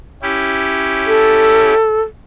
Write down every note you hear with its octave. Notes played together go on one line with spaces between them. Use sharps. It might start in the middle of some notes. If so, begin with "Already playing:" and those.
C#4 E4 G4
A4